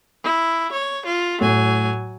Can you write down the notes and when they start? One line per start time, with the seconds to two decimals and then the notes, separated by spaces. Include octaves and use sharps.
0.23 E4
0.72 C#5
1.06 F4
1.41 A2 F#3 G#5